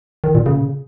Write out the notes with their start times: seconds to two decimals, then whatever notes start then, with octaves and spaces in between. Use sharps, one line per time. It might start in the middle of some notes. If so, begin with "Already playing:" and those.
0.24 D#3
0.35 A#2
0.46 C#3